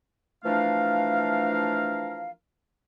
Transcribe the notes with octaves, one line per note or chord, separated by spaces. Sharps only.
E3 F3 A3 D4 A#4 F5